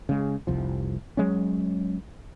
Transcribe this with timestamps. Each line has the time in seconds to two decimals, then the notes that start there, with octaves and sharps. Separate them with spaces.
0.09 C#3 G#3
0.47 F1 C2 F3
1.17 F#3 G#3 C#4